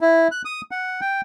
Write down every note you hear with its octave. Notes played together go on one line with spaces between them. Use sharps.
E4
F#6
D#6
F#5
G5